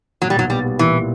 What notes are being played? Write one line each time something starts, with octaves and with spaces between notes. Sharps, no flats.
A#2 F#3
G3
B1 F#3
G3 B3
G3
A#2 E3